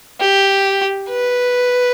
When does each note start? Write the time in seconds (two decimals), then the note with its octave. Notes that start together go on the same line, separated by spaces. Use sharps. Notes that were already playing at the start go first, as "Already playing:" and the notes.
0.21 G4
1.10 B4